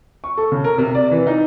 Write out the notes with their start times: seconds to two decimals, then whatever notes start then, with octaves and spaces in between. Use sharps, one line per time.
0.24 C#6
0.38 A4
0.52 C#3
0.64 A#4
0.78 C3
0.95 D5
1.11 E3
1.27 D#4